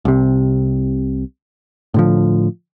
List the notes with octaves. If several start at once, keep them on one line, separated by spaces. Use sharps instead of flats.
C2 C3
A2 D3 F3